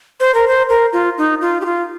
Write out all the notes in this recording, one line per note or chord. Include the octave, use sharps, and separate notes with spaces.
C5
A#4
C5
A#4
F4
D#4
F4
G4
F4